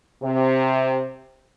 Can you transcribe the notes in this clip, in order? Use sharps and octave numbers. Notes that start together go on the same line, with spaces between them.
C3